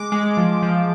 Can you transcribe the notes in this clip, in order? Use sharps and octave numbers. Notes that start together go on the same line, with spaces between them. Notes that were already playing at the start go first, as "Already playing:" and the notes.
Already playing: G#3 D6
G#3
F3
F3